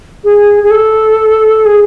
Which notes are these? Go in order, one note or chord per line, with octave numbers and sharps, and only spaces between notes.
G#4
G#4
A4
G#4